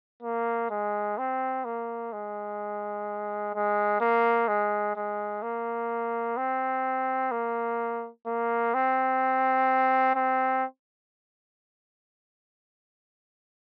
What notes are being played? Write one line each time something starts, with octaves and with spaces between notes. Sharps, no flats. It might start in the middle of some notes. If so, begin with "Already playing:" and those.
A#3
G#3
C4
A#3
G#3
G#3
A#3
G#3
G#3
A#3
C4
A#3
A#3
C4
C4